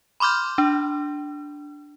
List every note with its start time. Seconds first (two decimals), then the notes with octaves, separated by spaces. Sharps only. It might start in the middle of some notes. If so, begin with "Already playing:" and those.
0.20 B5 C6 D6 F6 G6
0.58 D4